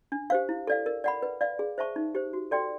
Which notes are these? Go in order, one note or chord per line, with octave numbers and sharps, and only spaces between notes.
D4
G4 C5 F5
E4
A4 D5 F5
A#4
D5 F#5 B5
B4
D5 F5
G#4
C5 E5 A5 C#6
D#4
G4 C5
F#4
A4 D5 G5 C6